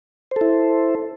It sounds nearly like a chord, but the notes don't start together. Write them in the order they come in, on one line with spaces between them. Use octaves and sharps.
C5 A4 E4